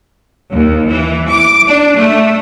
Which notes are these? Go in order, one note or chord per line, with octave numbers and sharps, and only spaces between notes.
D#2
E3
D6
D4
A3